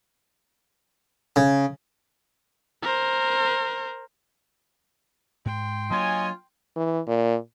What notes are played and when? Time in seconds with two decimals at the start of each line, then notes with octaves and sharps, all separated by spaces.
1.36 C#3
2.82 A#4 C5
5.46 G#2 G5 C6
5.90 F#3 A#3 D4 F4 C#5 D#5 G#5
6.76 E3
7.07 A#2